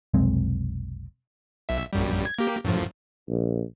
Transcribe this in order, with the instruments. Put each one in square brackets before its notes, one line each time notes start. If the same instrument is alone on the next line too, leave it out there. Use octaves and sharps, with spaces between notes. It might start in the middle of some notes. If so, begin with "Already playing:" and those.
[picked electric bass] F1 B1 G#3 C4
[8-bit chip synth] B1 E5
A#1 F#2 G3
G#6
A#3 G4
F#2 A2 F3
[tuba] A#1